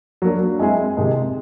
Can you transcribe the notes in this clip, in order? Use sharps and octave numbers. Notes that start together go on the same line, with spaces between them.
F#3 A#3 D4
G#3 C4 E4 G#4
C3 D#3 G#3